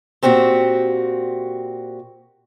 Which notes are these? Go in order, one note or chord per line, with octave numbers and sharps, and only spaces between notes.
A#2 C4 F#4 G4